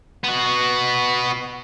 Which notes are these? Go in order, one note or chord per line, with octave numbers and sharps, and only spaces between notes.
B3 F#4